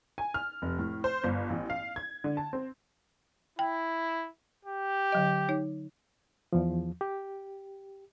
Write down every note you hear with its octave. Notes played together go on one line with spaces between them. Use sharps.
G#5
F6
F1
A2
C5
G1
A1
F5
G#6
D3
A5
C4
E4 G5
G4
D3 F#3 D#5
D#4 C#5
E2 F3
G4